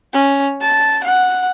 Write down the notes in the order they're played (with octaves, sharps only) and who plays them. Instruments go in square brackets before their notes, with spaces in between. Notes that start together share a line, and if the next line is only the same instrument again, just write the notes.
[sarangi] C#4
A5
F#5